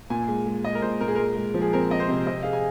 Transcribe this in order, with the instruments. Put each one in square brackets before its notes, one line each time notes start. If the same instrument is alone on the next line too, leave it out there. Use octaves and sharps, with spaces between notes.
[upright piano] A#2 [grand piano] G#5
[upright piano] G#3
G#3
[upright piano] G#3 [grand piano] D#5
[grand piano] A#4
[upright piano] A#2 [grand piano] C5
[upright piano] A#2 [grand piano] A#4
[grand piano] G#4
[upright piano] G#3 [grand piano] A#4
[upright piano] G#3
F3
[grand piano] G#4
[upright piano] C4 [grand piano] A#4
[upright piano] C4 [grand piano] D#5
[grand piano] C5
[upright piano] C3
[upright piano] C3 [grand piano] D#5
[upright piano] G#4 [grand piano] F5
[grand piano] G#5